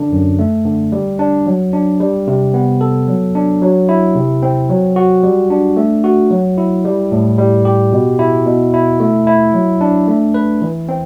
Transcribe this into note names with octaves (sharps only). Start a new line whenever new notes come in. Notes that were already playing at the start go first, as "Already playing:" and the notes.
Already playing: D3 D4
F#2
A3
D3
G3
D4
F#3
D4
G3
C3
B3
A4
F#3
D4
F#3
E4
C3
C4
F#3
F#4
G3
D4
A3
F#4
F#3
E4
G3
A2
G3
G4
B2
E4
B2
E4
A3
E4
F#3
D4
A3
B4
E3
C4